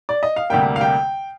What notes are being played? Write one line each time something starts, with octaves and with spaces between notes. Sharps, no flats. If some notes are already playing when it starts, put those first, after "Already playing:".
D5
D#5
F5
D2 C3 G3 A#3 G5
F5
G5